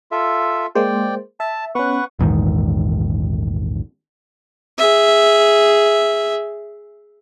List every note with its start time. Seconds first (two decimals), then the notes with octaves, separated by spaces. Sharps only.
0.11 F4 A4 E5
0.75 G#3 A#3 C5 D5 G5
1.40 E5 A5
1.75 B3 C#4 B4 F#5 C#6
2.19 A#1 E2 G#2 D#3
4.78 G#4 E5